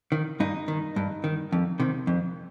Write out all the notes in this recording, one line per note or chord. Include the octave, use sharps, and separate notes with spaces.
D#3
G2 D#4
D#3
G2
D#3
F2
C3 D#3
F2